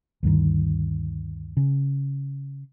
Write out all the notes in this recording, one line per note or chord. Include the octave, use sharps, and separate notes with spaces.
D2 G2 D#3
C#3